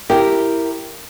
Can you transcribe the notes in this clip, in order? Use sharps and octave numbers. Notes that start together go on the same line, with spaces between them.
E4 G4 A#4